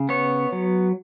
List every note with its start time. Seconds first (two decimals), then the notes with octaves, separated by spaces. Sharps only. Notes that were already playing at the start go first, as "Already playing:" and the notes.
Already playing: C#3
0.09 B3 C#5
0.52 F#3